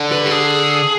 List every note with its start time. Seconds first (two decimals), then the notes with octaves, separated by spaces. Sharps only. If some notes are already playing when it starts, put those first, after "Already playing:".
Already playing: D3
0.12 B4
0.26 G4
0.31 G#4